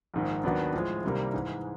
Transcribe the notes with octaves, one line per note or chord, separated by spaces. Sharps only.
A#1 G#2 D#3
D#2 D#3 F#3 B3 D4
A2 F3 G#3
C2 C3 D#3 G3 A#3
G#2 E3 G#3